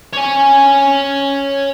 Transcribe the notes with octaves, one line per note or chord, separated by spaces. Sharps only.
C#5 G#5